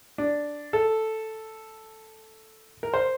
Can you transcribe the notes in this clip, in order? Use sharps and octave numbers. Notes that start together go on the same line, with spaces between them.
D4
A4
A#4
C5